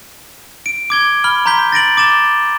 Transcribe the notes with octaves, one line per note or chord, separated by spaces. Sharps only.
D7
D6 G#6 G7
B5 F6 G7
A#5 C6 G6 B6 G7
A6 A#6 D7 F#7
D6 A6 E7 G7